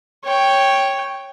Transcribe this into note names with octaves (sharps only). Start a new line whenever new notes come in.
C#5 G5